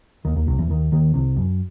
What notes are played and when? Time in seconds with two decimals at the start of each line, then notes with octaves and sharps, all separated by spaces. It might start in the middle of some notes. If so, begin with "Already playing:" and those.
0.25 D#2 D#3
0.36 D#2 D#3
0.47 C2 C3
0.59 E2 E3
0.70 D#2 D#3
0.92 D#2 D#3
1.14 C2 C3
1.37 F#2